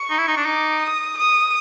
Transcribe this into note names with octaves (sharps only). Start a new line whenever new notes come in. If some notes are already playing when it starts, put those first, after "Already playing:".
Already playing: C#6
D#4
E4
D#4
D4
D#4 D6
D#6
D#6